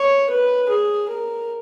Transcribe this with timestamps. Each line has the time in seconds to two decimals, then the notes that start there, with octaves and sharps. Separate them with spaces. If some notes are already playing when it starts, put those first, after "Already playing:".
Already playing: C#5
0.30 B4
0.69 G#4
1.09 A#4